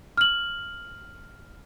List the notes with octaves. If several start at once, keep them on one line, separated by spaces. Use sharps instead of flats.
F6 F#7